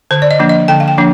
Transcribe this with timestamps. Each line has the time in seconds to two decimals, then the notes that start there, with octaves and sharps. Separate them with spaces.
0.11 D3 C5
0.22 D5
0.31 D#5
0.39 F3 A#3 D4
0.49 D#5
0.68 D3 G5
0.80 F5
0.88 G5
0.98 F3 A#3 D4